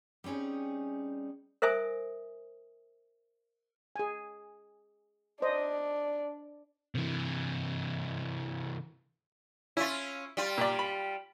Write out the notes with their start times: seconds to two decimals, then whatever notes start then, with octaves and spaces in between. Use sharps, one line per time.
0.24 G3 C4 C#4 D#4 G#4
1.62 A#4 C5 E5 G#5 D#6
3.96 G#4 G#5
5.42 D4 C5 D#5
6.95 C3 E3
9.77 C#4 E4 F4
10.37 G3 F4
10.58 A#2 D5
10.79 B5